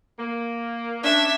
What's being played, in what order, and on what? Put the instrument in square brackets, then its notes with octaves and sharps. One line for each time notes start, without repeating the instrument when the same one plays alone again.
[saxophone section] A#3
[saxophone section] C#4 D4 [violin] E5